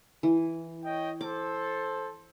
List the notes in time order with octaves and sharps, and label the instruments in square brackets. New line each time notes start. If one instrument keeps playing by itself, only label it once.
[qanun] E3
[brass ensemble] C#5 D#5 G5
[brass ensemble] A4 C5 [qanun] D6